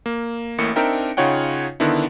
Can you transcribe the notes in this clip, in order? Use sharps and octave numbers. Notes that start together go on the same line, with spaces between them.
A#3
A1 A2 A#3 C#7
C4 D4 D#4 A#4 E5 G5
C#3 D#4 F4 C#5 F#5 G5
D3 D#3 B3 D4 E4